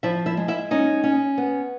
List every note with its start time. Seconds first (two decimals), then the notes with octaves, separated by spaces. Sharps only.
0.03 F3 E4 E5
0.26 E4 E5
0.37 G#3
0.48 E4 E5
0.71 C#4 D#4 D#5
1.04 C#4
1.38 B3